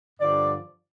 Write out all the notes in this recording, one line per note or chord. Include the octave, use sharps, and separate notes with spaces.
G2 D3 F3 D5